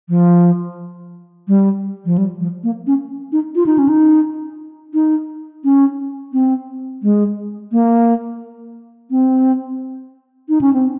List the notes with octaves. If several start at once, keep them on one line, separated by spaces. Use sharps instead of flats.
F3
G3
F3
G3
F3
A#3
C#4
D#4
F4
D#4
C#4
D#4
D#4
C#4
C4
G#3
A#3
C4
D#4
C#4
C4